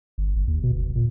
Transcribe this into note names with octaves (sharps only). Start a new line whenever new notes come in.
G1
G1
D#2
B2
F#1
A#2